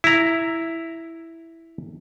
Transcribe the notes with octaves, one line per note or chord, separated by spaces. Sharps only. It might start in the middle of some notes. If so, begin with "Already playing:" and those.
E4 A#5